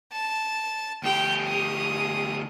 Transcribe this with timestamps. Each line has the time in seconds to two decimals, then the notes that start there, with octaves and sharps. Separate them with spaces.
0.12 A5
1.03 D2 G4 G5
1.47 D#6